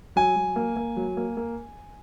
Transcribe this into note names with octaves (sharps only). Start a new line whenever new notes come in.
F#3 G#5
F#3
A#3
A#3
F#3
A#3
A#3